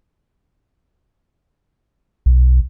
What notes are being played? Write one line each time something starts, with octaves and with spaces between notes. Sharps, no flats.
B1